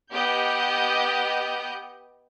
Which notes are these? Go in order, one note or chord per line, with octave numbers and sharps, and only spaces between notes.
B3 G4 D#5 G6